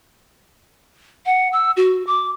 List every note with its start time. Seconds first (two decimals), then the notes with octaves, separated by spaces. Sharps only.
1.26 F#5
1.53 E6
1.77 F#4
2.07 D6